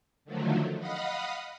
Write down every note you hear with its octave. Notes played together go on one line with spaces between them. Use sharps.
D3 D#3 F3 F#3 A3
D#5 F5 F#5 B5 D#6